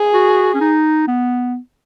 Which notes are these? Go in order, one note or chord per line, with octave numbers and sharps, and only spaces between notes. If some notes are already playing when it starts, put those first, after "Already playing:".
Already playing: G#4
F#4
C#4
D#4
B3